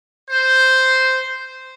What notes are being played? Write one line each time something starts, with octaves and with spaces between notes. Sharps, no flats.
C5